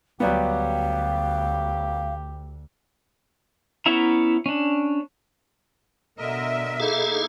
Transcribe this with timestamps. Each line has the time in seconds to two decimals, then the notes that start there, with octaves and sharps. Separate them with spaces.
0.20 D2 F#3 G3 B3 G4 F5
3.86 B3 C#4 E4 E5 A#5
4.46 C#4 D4
6.18 B2 D3 A#4 D#5 E5
6.80 A#3 D#4 E4 G#4 A4 F5